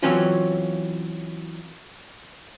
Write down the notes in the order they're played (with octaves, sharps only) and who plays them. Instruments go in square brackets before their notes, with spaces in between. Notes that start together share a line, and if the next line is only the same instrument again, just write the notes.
[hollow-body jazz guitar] E3 F#3 C4 C#4 F4